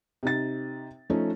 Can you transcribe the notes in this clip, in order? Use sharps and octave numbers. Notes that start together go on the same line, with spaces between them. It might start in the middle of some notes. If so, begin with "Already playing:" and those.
C3 D#4 A6
F3 A3 C#4 D#4